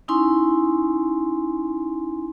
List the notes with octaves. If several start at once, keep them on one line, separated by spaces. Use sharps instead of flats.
C#4 D#4 E4 G#5 C6